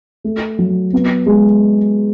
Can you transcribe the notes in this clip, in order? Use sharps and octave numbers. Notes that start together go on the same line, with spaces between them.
A3
F#3
B3
G#3